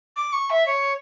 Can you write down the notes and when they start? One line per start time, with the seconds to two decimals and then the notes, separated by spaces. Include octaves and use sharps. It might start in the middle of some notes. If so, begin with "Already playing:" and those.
0.16 D6
0.33 C#6
0.50 E5
0.66 C#5